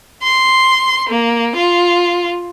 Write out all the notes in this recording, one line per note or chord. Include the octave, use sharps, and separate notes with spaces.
C6
A#3
F4